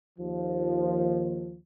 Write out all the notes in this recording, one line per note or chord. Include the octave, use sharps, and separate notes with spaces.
D#2 F3